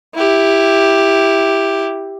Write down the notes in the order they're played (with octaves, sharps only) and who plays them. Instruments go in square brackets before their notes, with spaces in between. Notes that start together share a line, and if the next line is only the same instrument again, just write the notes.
[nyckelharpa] E4 G4